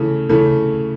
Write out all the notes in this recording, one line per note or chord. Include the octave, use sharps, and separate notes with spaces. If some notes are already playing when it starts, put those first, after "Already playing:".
Already playing: C#3 E3 A3
C#3 E3 A3